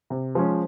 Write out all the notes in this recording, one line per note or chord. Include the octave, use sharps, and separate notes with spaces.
C3
F3 G#3 C#4